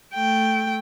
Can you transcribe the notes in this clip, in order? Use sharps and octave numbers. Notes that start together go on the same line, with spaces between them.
A3 G5